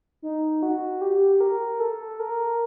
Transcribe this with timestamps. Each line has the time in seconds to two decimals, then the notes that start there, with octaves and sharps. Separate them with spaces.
0.22 D#4
0.63 F#4
1.01 G4
1.41 A#4
1.80 A4
2.20 A#4